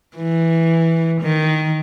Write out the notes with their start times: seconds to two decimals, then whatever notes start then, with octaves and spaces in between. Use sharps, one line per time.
0.16 E3
1.22 D#3